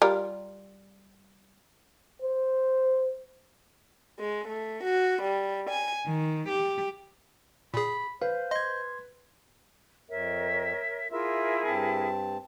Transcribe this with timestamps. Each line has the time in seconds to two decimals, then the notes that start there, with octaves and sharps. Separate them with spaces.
0.02 G3 F4 A#4
2.22 C5
4.19 G#3
4.49 A3
4.84 F#4
5.22 G3
5.70 G#5
6.06 D#3
6.48 G4
7.74 A#2 G#4 B5
8.22 B4 C5 F5
8.51 D#5 C6 G#6
10.09 F2 A#4 C#5 E5
11.12 E4 F4 G#4 A#4 E5
11.66 G2 C4 A5